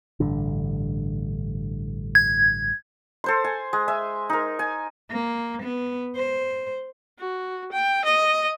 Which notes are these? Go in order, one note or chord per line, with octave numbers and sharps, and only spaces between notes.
A1 G2 D3
G#6
A4 C5 C6
G#5
G#3
E5 G#5
D#4 A#4
G#5
A#3
B3
C5
F#4
G5
D#5